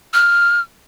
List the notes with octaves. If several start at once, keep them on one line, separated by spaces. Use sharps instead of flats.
F6